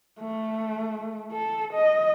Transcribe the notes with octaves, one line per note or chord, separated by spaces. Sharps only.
A3
A4
D#5